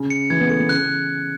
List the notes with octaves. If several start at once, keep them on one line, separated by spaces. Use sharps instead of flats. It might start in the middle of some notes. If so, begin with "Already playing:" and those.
Already playing: C#3
C#7
E3 G#6
B3
A3 C#7
B3
C#3 F#6